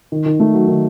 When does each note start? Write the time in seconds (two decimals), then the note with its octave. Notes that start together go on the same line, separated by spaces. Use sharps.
0.12 D#3
0.26 D#3
0.40 A3
0.54 F#3
0.68 D#3